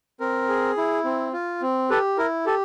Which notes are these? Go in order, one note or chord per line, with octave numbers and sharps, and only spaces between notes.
C4 A#4
G#4
E4
C4
F4
C4
G4 A4 B4
E4 A#4
G4 A4